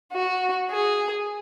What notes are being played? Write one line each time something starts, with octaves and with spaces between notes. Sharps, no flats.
F#4
G#4